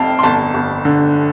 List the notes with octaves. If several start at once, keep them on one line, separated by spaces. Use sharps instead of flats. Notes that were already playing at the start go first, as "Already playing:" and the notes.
Already playing: F1 F2 F5 G5 A5
C6
G1 A5
G1
D3